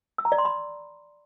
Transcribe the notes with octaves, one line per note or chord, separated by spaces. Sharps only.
E6
A#5
D5
C6
B5